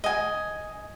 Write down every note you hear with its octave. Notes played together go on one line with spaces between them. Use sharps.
D#5 G#5